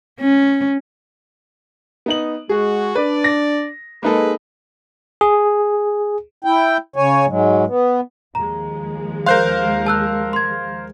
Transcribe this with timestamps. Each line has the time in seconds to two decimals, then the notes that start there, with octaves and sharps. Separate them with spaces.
0.20 C#4
2.06 B3 D#4 F#7
2.49 G#3 F#4 G#4
2.95 D4 B4 D5
3.24 A#6
4.03 G#3 A#3 D#4 A4 B4
5.21 G#4
6.44 E4 G5
6.96 C#3 C#5 G#5
7.27 G#2 F#3 G#3
7.67 B3
8.35 D#2 F3 G#3 A#5
9.26 A#4 C5 F5 C6 F#6 G6
9.86 A5 E6 F#6
10.33 C6 G#6